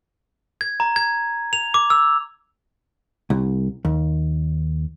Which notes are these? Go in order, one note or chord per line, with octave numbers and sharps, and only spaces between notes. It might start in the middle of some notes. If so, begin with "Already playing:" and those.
G#6
A#5
G#6
F7
D6
E6
C2
D#2